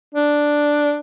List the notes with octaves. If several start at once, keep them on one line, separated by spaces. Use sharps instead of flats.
D4